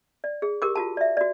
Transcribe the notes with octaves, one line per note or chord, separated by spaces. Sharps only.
D5
G#4
G4 A#4 D6
F4 F#4 A5
D5 E5
F#4 D5